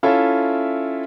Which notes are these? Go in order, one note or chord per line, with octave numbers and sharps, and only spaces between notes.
C#4 E4 F4 A4 E5